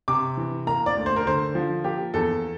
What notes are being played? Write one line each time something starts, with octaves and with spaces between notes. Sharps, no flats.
C3 D6
E3
A#3 A#5
D5
D2
C5
A#4
D3 C5
F3
A#3 G4
E2 A4